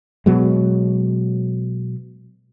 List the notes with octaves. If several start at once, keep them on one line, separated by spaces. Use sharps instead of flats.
B2 F#3 G#3